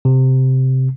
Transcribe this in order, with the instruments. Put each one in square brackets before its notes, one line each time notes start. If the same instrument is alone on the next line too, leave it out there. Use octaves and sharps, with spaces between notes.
[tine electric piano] C3